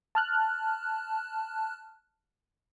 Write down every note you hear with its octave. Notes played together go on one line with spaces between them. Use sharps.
A5 F6 F#6